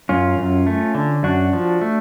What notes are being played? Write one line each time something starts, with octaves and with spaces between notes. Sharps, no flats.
F#2 C#4 F4
F#2
A3
D3
F#2 D4 F#4
F3
A3